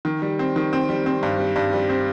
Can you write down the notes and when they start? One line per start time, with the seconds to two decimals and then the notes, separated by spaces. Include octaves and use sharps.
0.05 D#3
0.22 G3
0.39 C4
0.56 D#3
0.73 C4
0.89 G3
1.06 C4
1.23 G2
1.39 G3
1.56 G2
1.73 G3
1.89 C4